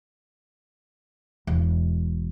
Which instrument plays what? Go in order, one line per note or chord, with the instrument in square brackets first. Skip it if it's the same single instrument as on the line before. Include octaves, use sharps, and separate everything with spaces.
[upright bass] E1